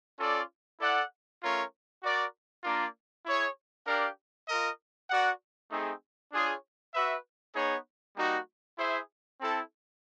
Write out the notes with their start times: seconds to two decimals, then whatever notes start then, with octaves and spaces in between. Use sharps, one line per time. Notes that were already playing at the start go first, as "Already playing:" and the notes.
0.19 C#4 F4 A4 D5
0.80 E4 A4 D5 F#5
1.42 A3 C#4 F4 A#4 C#5
2.03 F#4 A#4 D5
2.64 A#3 D4 F4 A#4 D5
3.26 E4 G#4 C#5
3.87 D4 G4 A#4 D5 F5
4.48 F4 A#4 D#5
5.09 F#4 A#4 D5 F#5
5.72 A3 C4 D#4 G#4
6.32 D4 F4 G#4 C#5
6.94 F#4 B4 E5
7.55 B3 D#4 G#4 C#5
8.17 G3 A#3 D#4 F#4
8.78 E4 G#4 C5 E5
9.39 C4 E4 A4